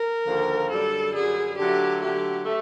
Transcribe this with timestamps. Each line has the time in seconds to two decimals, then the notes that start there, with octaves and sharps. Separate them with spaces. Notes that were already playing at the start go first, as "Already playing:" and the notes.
Already playing: A#4
0.27 D#2 D3 F3
0.71 F#2 D3 G3 A4
1.14 F#2 D3 G3 G#4
1.58 D3 F#3 A3 G4
2.02 D3 F#3 A3 G4
2.45 A3